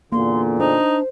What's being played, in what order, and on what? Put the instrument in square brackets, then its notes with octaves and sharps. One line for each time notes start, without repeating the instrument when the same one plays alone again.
[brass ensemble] E2 A#2 D3 [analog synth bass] A#3 [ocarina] C6
[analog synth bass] D4 [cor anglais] D#4 [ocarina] C5